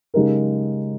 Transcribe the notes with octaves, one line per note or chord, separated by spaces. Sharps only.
C#3 G#3 D#4 G4 A#4